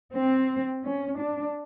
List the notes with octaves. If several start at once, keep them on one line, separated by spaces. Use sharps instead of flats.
C4
C#4
D4